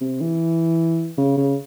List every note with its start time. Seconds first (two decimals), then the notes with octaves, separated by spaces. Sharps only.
0.01 C3
0.21 E3
1.18 C#3
1.37 C#3